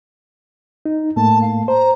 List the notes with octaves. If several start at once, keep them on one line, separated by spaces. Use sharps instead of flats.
D#4
A2 A3 A#3 A5
F5
C5 A#5